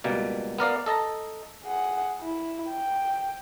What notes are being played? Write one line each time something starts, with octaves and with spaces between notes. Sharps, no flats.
C#2 B2 G3 A#3
B3 A#4 D5 F5
A4 D#5 A5 A#5
G#4 F#5
E4
G5